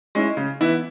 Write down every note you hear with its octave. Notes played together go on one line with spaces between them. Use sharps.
G#3 C#4 E4
C#3
E3 B3 E4